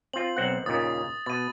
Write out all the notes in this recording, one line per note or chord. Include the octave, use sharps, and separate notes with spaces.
C4 F4 F#7
B1 C4 F#5
D#2 A#2 C#3 D#6 A6
B2 A6 D#7